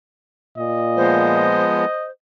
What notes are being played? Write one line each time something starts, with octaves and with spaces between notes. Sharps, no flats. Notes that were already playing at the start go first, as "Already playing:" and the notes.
A#2 D#5
F3 G#3 B3 C5